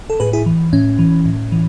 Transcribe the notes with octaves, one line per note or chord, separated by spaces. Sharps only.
A4
A2 G#4 B4
E4 G#4
E3
A2 C#4
E3
A2
E3